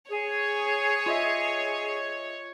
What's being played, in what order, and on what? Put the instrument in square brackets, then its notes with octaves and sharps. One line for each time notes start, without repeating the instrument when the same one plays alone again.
[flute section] G#4 [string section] C#5
[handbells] F4 D#5 E5